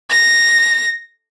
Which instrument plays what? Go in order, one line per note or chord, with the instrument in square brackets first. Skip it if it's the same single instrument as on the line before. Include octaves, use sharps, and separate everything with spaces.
[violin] A#6